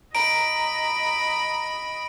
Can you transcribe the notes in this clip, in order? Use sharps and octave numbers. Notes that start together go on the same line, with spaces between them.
D#5 A#5 B5 D7